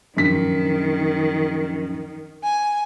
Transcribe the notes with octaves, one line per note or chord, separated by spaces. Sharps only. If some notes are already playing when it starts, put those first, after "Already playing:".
A#1 F#2 D#3 B6
G#5